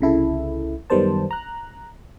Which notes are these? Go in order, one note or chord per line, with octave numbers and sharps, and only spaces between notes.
C2 C#3 E4 A4
F#2 D#3 G3 B3 C5 A5
A#5 F#6